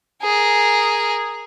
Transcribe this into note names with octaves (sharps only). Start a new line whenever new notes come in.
G#4 A#4